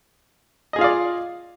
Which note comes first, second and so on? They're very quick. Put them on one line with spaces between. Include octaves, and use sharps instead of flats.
D#5 G#4 F4 F5 D5